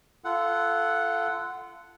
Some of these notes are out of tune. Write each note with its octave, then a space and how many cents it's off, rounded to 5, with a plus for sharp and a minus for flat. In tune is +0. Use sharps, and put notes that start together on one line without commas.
F4 -25 A4 +0 F#5 +0